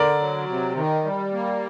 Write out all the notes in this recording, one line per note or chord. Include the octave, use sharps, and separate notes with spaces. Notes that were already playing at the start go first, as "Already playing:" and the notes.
Already playing: D3 A#4 D5
F#3
C3
D#3
G3
A#3